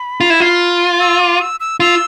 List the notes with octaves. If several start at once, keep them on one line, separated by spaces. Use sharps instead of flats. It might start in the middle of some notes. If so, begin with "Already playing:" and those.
Already playing: B5
F4
E4
F4
E6
D6
E6
E6
F4 E6